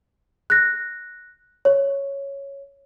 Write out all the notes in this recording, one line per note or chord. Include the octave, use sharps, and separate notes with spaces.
F#6 A#6
C#5